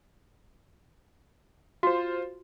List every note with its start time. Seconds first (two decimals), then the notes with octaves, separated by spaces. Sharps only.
1.83 F4 F#4 C5